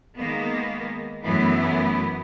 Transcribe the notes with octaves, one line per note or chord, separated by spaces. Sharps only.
D#3 G#3 A#3 B3
F#2 E3 F#3 A3 B3 E4